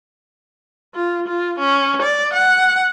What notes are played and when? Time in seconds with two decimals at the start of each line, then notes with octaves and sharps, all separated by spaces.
0.95 F4
1.28 F4
1.59 C#4
2.02 D5
2.33 F#5